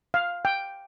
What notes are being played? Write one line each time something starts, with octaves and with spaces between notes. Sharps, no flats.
F5
G5